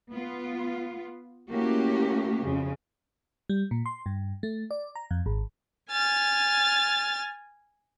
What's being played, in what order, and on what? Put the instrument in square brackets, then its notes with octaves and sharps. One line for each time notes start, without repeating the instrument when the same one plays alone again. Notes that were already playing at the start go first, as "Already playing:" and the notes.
[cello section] B3 F4
A3 A#3 C#4 E4 F#4 G4
F2 C#3
[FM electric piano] G3
A#2
C6
G2
A3
D5
A#5
F2
G#1
[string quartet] G#5 F6 A6